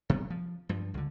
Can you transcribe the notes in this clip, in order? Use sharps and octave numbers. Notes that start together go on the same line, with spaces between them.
C3 G3 B3
F3
G2 F3
C#2 D3